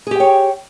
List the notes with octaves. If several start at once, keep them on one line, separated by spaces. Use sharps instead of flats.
G4 G#4 C#5 G5